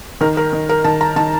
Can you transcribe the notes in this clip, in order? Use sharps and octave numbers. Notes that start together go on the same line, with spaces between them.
D#3 A#4
A#4
D#3
A#4
D#3 A5
A#5
D#3 A5